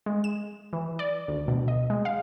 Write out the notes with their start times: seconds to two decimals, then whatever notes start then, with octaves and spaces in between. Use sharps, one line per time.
0.06 G#3
0.24 E7
0.73 E3
0.99 D5
1.28 D2
1.48 B2
1.68 D#5
1.90 G#3
2.05 F5